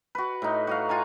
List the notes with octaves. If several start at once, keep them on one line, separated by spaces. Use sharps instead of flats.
F#4 B4
A2 D#4
F#4 D#5 F5
F4 F#5 G#5 A#5